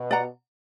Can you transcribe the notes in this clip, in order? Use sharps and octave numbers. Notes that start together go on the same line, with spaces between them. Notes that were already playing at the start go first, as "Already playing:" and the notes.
Already playing: B2
D5 F#5 A#5